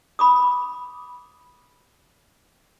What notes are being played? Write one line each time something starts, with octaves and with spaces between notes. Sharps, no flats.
B5 D6 D#6